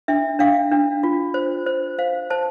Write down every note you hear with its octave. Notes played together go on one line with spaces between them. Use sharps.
D4 E5
D4 F5
D4
F4
C5
C5
C5 F5
C5 A5